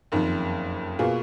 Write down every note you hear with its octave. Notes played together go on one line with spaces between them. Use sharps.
F#1 F2 D#3
B2 A#3 F4 G#4